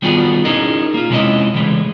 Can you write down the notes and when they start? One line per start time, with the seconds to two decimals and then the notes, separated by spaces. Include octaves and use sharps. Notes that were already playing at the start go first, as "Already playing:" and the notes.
0.02 D#3 G3 B3 F4 F#4 G#4
0.45 C#4 D#4 E4 G#4 A#4 D#5
0.94 A#3 F4
1.10 C3 F3 G#3 C#4 E4 D#5
1.55 C#3 E3 G#3 A3